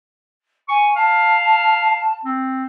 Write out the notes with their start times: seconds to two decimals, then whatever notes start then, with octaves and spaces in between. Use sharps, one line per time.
0.69 G#5 C#6
0.96 F5 A5
2.25 C4